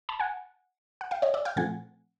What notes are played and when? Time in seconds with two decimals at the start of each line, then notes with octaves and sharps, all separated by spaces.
0.09 A5 B5
0.20 F#5 G#5
1.01 F#5
1.11 F5 G5
1.22 C#5 D#5
1.34 D5 E5
1.45 F5 G5
1.56 A#2 F3 A3 C4 F#5 G#5